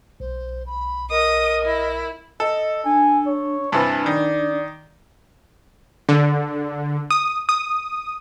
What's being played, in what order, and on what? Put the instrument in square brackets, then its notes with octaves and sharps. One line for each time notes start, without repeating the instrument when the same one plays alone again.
[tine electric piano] B1 [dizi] C5
[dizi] B5
[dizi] A#4 [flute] D#5 [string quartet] D#6
[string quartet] E4
[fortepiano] A4 [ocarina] D#5
[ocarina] D4 [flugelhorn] G#5
[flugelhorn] C#5
[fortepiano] G2 C3 E3 [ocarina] D4 [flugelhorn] A5
[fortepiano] D#3 [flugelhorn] D5
[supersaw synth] D3
D#6
D#6